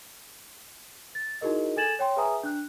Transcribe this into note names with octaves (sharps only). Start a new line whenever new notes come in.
A6
D#4 E4 F#4 G#4 A#4 D#5
A4 G#5 G#6 A6 E7 F#7
C#5 G5 C6
G#4 B4 E5 G#5 A#5 D#6
D4 F#6